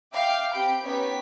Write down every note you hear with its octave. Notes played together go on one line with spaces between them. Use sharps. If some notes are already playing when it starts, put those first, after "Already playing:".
E5 F5 G5 D6 G6
C4 G4 G5 B5 G6 D7
B3 C#4 D#4 G4 C#5 B6